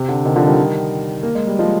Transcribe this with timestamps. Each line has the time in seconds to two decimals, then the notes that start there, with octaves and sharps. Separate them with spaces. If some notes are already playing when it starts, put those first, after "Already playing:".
Already playing: C3
0.09 D3
0.25 C3 D#3
0.36 D3 F3
0.47 D#3 G3
1.23 A#3
1.35 G#3
1.47 G3
1.59 F3 G#3